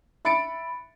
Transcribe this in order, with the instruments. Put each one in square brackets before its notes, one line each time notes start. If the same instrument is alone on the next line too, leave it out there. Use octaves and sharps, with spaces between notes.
[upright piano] E5 B5 A6 C#7 D7